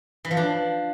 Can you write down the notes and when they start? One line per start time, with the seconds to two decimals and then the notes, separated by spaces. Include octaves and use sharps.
0.25 E3
0.31 F3
0.37 D4